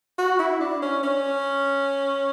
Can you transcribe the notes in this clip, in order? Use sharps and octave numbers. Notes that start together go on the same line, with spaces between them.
F#4
E4
D4
C#4
C#4